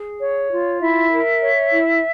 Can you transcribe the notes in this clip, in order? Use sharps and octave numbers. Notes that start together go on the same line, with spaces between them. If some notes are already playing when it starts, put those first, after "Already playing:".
Already playing: G#4
C#5
F4
E4 E5
A#4
C#5
E4